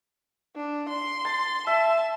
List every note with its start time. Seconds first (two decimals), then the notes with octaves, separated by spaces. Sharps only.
0.56 D4
0.89 C6
1.25 A5
1.67 E5 A5